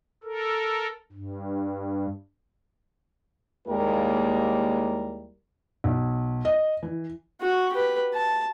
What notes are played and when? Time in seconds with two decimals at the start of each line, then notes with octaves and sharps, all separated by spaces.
0.24 A4 A#4
1.12 G2
3.68 D#2 G3 G#3 A#3 E4 A#4
5.84 B1
6.45 D#5
6.83 E3
7.41 F#4
7.73 G4 B4
8.14 A5